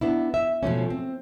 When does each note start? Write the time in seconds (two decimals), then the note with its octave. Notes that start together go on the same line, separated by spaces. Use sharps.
0.01 B3 D4 E4
0.34 E5
0.63 B2 F3 A3 C#4
0.90 C4